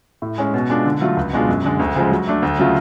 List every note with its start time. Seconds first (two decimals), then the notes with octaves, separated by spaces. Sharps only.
0.22 A2
0.38 G#3 C#4
0.54 B2
0.70 G#3 D4 F4
0.85 D3
1.01 F#3 A3 F4
1.17 C#2
1.33 B2 G#3 D4 F4
1.48 F#2
1.65 D3 G#3
1.79 D2
1.95 C#3 F3 G#3
2.12 F#3
2.27 A3 D4
2.42 D2
2.59 C#3 F#3 A3 F4